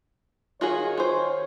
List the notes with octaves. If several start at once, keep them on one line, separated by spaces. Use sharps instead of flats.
D#3 F4 F#4 G#4 C#5
F4 C5